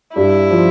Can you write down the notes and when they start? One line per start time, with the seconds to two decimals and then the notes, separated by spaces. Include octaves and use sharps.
0.16 G2 E4
0.51 F3